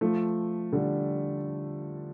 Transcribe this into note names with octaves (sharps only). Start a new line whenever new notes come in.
F3 A3
D3 G3